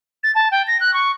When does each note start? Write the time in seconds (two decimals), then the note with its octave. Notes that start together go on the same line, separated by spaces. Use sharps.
0.24 A6
0.35 A5
0.52 G5
0.68 A#6
0.81 F#6
0.94 C#6